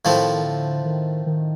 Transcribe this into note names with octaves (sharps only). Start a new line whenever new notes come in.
A2 D#3 F3 A3 C4
D3
D#3
D#3